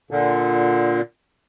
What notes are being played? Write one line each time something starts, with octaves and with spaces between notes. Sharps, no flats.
A#2 D3